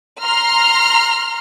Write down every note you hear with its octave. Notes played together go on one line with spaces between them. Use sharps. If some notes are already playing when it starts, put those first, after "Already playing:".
A#5 C6 F6